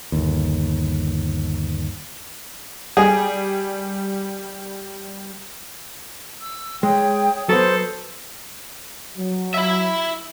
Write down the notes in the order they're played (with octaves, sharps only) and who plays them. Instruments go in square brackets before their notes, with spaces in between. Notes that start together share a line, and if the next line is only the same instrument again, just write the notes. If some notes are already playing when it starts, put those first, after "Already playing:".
[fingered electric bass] G1 D#2
[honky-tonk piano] G3 [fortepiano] G#4
[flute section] E6
[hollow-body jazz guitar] G#3 [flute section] C#5 G5 D#6
[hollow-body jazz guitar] F#3 B3 [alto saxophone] A4 [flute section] C5 D#6
[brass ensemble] F#3
[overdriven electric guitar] E4 E5